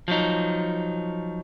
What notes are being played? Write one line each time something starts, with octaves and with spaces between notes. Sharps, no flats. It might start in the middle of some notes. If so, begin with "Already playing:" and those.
F3 F#3 D#4